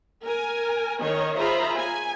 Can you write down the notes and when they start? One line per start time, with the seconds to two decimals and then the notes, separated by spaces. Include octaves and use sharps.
0.24 A#4 G#5
1.02 D#3 C#5 D#5
1.38 F4 G#4 C5 E5 A#5 B5
1.79 G#5